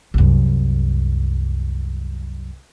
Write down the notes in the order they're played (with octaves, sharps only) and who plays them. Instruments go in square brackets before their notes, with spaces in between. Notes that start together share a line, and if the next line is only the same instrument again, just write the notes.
[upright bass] C2 F#2